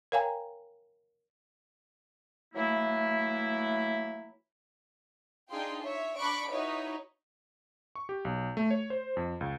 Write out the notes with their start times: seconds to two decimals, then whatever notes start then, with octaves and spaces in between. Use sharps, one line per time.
0.12 A#4 C#5 F5 G5 G#5 A#5
2.54 E3 F#3 A3 A#3 E4
5.50 D4 D#4 F4 G#4 G5 C6
5.83 C#5 E5
6.19 D4 B5 C#6 D6 F#6 D7
6.50 D#4 E4 F#4 B4 C#5
7.95 C#6
8.09 G4
8.25 B1
8.57 A3
8.71 C#5
8.90 C5
9.17 F2
9.41 C#2